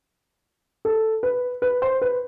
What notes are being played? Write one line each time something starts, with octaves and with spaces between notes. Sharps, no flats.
A4
B4
B4
C5
B4